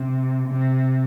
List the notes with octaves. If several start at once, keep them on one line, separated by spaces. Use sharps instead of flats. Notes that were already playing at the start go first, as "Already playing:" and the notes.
Already playing: C3
C3